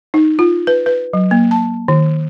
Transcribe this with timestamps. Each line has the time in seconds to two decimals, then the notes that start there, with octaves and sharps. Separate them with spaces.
0.14 D#4
0.39 F4
0.67 B4
0.86 B4
1.13 F#3
1.31 A#3
1.51 A5
1.88 D#3